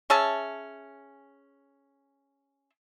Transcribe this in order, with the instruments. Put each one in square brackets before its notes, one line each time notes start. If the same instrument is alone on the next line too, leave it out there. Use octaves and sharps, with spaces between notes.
[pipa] C#4 G#4 E5 A5